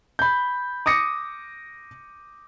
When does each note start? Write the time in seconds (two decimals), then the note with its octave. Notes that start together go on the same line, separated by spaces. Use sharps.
0.19 B5 G6
0.86 D6 D#6 A#6 C#7